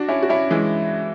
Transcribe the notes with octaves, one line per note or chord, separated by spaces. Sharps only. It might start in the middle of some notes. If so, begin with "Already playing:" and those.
Already playing: D4 F#4
C#4 E4
F#4
C#4 E4
E3 G#3